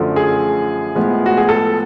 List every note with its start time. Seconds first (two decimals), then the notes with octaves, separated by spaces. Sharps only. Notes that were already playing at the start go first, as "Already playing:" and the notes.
Already playing: F#2 D3 F3 A3
0.16 G#4
0.95 A2 F3 G#3 B3
1.26 F#4
1.38 G#4
1.49 A4